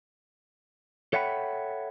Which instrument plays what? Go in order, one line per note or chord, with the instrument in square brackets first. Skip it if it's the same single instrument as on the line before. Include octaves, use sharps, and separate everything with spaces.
[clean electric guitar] A4 C#5 E5 F#5 G5 B5